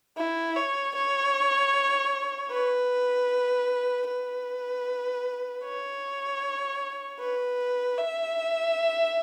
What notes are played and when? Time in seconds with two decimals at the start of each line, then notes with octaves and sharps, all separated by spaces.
0.17 E4
0.56 C#5
0.95 C#5
2.51 B4
4.08 B4
5.64 C#5
7.20 B4
7.98 E5